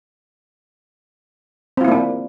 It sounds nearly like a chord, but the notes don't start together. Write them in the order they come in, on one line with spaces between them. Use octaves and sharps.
C4 F4 E4 A#3 D4